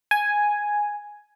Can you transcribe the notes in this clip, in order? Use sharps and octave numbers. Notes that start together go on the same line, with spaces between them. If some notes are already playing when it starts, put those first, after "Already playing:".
G#5